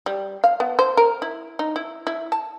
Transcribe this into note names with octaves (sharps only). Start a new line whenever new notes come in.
G3
F5
B3
C5
A#4
E4
D#4
E4
E4
A5